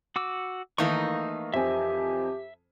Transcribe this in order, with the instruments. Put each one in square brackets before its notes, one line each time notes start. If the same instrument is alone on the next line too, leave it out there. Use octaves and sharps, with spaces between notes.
[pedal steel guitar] F#4 D6 E6
[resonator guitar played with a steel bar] D#3 E3 D#4 [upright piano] A3 A#3 F5 [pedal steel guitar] C#6 G6
[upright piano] F2 C4 G#5 [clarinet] G4 [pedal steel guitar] E5